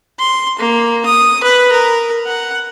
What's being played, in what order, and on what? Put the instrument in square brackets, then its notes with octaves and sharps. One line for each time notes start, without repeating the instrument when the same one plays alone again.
[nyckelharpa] C6
A#3
D#6
B4
A#4
F#5